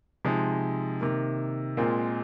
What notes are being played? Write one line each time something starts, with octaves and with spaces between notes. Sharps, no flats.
C3 F3 G#3 D#4
C3 D#3 A#3
A#2 G#3 C4 F4 A#4